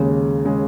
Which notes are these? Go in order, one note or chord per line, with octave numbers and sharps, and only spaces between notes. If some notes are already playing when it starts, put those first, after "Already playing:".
Already playing: D#2 C#3 G#3
C#3 G#3